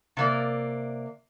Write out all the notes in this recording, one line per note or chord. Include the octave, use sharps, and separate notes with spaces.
C3 A#3 D5